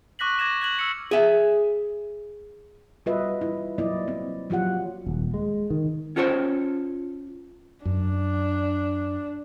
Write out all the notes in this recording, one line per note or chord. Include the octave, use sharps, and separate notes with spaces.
C#6 D6 F#6 A#6 B6 F#7
D6 G#6 A#6 E7
F#6 G#6 F#7
E6 F6 C#7
G#4 E5
G3 F4 F#4 B4 D#5 E5
E4
F#3 A#3 E4 D5 D#5
C4
F3 F#3 F4 G4 F#5
D#1
G#3
D#3
C#4 F4 A4 C5 C#5
F#2 D4